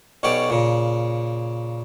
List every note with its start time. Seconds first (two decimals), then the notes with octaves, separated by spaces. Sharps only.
0.23 B1 B2 C#4 G4 D5
0.50 A#2 C#3